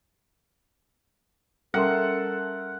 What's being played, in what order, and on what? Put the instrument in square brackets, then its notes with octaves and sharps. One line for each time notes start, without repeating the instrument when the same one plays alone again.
[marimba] G3 C#4 [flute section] A4 [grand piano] A#4 E5 C6 [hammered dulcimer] F#5